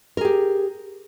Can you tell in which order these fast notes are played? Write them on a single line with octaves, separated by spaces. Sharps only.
A#4 G#4 G4